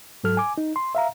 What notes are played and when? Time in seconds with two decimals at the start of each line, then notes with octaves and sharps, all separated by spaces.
0.24 G#2 F#3 A4 F6
0.37 G#5 D6
0.58 D#4
0.76 C6
0.95 E5 F5 A#5